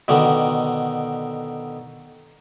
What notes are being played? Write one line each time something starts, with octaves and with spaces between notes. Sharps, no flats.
B2 D3 D#3